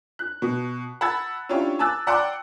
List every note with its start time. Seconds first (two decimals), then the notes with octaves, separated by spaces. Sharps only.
0.19 F#6
0.42 B2
1.01 F#5 A5 B5 E6 G#6 A6
1.49 C#4 D4 E4 F4 G4 C#5
1.79 G#5 A5 D6 E6 F#6 A6
2.07 D5 F#5 G5 A5 C6 D6